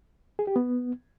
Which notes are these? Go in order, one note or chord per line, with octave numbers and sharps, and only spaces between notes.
G#4
G4
B3